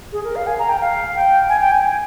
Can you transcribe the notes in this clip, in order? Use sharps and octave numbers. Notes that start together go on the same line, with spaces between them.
G#4
A#4
F5
G#5
A#5
G5
F5
G5
G#5
G5
G#5